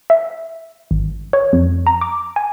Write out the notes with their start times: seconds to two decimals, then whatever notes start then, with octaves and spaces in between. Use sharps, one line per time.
0.10 E5
0.91 G#1
1.33 C#5
1.53 F2
1.87 A#5
2.01 D6
2.36 G#5